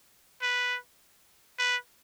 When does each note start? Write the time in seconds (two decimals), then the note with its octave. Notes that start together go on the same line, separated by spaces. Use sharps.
0.42 B4
1.59 B4